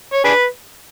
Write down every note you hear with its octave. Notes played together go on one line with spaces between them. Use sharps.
C#5
D4 G#4 B4